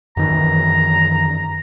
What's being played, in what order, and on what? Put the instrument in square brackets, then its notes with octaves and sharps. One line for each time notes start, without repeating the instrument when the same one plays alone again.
[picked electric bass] F#2 D#3 E3 [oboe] A#5